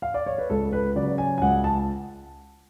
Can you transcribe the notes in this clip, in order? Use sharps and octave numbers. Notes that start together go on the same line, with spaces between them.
F5
D5
C#5
B4
C#2 A4
B4
C#3 F#3 D5
G#5
G#5
C#2 F#5
A5